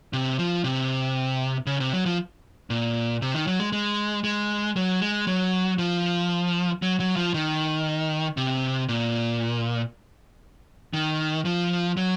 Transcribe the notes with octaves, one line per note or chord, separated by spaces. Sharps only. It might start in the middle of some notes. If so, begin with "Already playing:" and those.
C3
F3
C3
C#3
C3
F#3
F3
A#2
C3
D#3
F#3
G#3
G#3
G#3
F#3
G#3
F#3
F3
F#3
F#3
F3
D#3
C3
A#2
D#3
F3
F#3